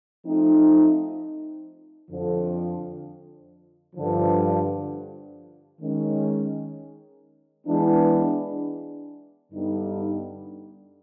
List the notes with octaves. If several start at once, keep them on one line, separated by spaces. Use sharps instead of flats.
F3 A3 C4 D#4
F2 D3 F3
G2 D3 F3
D#3 G#3 C#4
E3 G#3 B3 D4
G2 D3 G3 B3 D#4